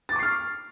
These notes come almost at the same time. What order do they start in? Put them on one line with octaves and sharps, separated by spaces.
A6 D6 C#6 C7 F6